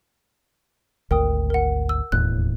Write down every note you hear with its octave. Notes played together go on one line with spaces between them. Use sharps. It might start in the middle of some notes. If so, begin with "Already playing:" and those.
G#1 D2 A#4 G5 D#6
A#4 F#5
E6
E1 D#2 A2 F#6